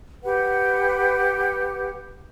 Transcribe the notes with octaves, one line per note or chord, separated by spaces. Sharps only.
G4 B4 F#5